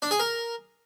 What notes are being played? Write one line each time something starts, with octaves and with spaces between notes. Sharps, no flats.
D4
G#4
A#4